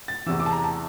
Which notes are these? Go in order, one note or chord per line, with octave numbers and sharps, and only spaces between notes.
A6
E2 C3 E3 E6
D6
A5
A#5
A5